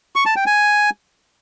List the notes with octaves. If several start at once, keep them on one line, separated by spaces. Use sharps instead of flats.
C#6
A5
G5
G#5